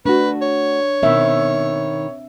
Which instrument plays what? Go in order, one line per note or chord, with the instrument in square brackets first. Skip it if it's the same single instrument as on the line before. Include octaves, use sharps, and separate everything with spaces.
[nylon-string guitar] A3 F#4 [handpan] D4 [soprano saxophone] B4
[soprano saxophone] C#5
[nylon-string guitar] B2 D#3 [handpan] C4 E5